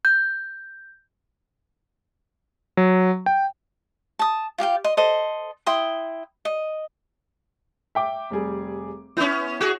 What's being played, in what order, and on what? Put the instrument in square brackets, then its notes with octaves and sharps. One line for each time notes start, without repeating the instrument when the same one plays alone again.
[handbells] G6
[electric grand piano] F#3
G5
[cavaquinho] A5 D#6
F4 G4 F5 G5
D#5 C6
A4 C5 D#5
E4 G5 C6 D#6
D#5
[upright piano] E5 G5 D6
F1 G3 G#4
[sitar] B3 C#4 [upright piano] E4
[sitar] F#4 G#4